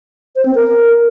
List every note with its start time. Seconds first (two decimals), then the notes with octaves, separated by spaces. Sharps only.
0.36 C5
0.45 C4
0.55 A#4